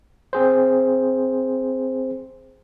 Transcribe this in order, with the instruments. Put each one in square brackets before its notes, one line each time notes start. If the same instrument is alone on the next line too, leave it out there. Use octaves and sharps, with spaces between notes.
[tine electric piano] C4 G#4 C5